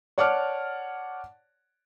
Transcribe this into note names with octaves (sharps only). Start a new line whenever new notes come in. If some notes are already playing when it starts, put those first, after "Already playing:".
C#5 D5 F#5 A5 D6 F6